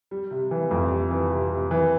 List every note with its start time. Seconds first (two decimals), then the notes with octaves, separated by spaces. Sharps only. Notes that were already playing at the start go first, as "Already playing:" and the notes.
0.11 G3
0.31 C3
0.51 E3
0.71 F2
0.91 G3
1.11 E3
1.30 C3
1.51 C3
1.71 E3